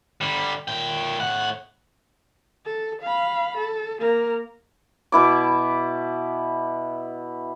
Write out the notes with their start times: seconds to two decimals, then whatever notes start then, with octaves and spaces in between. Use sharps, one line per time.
0.21 D3 G3
0.68 A#2 G5
1.20 A2 F#5
2.66 A4
3.02 F5 B5
3.58 A4
4.00 A#3 A#4
5.12 B2 E4 D6